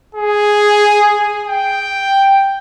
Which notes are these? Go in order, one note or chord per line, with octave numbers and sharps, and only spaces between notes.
G#4
G5